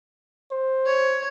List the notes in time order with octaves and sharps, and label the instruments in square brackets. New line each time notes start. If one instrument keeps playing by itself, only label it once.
[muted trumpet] C5
[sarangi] C#5